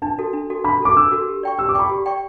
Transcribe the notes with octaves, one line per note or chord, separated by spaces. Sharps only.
D4 A5
F#4 A4
D4
F#4 A4
D4 B5
F#4 A4 D6
D4 E6
F#4 A4
G4
D5 G5 C#6
G4 E6
D6
D5 G5 B5 C#6
G4
D5 G5 C#6